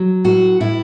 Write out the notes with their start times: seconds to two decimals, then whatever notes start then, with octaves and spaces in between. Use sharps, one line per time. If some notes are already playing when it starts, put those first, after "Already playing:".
Already playing: F#3
0.24 A2 F#4
0.60 A2 E4